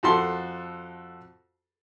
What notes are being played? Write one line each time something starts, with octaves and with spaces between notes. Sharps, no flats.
F2 F#4 A4 C6